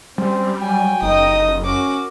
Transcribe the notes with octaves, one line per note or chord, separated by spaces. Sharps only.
G3 C4 C#4
F#3 G5 G#5
F#1 D#4 D#5 D#6
C#4 F#4 A#4 D6